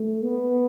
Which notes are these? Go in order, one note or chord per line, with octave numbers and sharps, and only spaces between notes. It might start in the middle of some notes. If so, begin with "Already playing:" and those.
Already playing: A3
B3